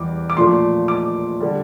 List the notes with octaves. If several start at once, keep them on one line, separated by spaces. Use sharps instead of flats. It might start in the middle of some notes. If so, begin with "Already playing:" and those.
Already playing: E2 E3 G3 D6
D6
A#2 F3 A3 C6
D6
D3 G3